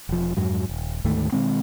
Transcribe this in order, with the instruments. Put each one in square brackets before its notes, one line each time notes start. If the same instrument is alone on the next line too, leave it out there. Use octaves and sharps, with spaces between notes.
[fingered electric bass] E1 F3
F2 G#2 F#3
D#1
D2 G#2 D#3 A3
B2 D#3 G#3 C4